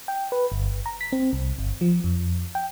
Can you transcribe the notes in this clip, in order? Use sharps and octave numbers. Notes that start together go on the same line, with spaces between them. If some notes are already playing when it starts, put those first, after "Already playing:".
G5
B4
G1
A#5
B6
C4
C2
G1
F3
F2
G5